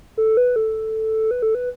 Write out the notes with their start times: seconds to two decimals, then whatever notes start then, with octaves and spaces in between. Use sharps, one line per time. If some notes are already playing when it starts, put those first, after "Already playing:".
0.18 A4
0.37 B4
0.56 A4
1.31 B4
1.42 A4
1.55 B4